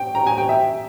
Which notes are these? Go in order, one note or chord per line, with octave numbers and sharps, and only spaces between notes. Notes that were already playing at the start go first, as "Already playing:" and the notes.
Already playing: G5
A#5
G#5
G5
E5